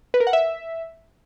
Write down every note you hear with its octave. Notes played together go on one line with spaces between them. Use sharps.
B4
A#4
F#5
E5